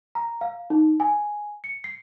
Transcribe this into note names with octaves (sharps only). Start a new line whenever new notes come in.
A#5
F5
D#4
G#5
C#7
C7